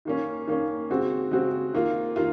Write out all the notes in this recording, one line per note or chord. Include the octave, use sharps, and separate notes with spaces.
D#3 A#3 C#4
D#3 A#3 C#4
C#3 G#3 C4 F#4
C#3 G#3 C4 F#4
D#3 A#3 F4
D#3 A#3 F4